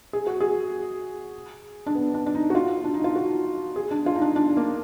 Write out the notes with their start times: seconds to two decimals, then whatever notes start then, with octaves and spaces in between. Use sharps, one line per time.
0.13 G#4
0.27 F#4
0.40 G#4
1.86 D4
1.95 B3
2.14 D4
2.26 D4
2.35 D#4
2.50 F#4
2.55 F4
2.84 D4
2.94 D#4
3.04 F4
3.15 F#4
3.76 G#4
3.91 D4
4.06 F4
4.16 D#4
4.21 D4
4.36 D4
4.57 A#3